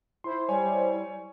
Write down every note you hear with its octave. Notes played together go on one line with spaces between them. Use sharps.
E4 C5 C6
G3 C#5 G#5